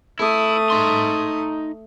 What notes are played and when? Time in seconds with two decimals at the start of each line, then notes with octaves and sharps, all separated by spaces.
0.19 A3 E4 D#6
0.70 D#4 C6